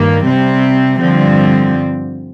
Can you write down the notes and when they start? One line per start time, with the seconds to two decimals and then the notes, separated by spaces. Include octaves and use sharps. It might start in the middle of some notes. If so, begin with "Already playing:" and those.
Already playing: G2 D#3 A#3
0.26 C3 G3 C4
1.01 G2 D3 F3 C4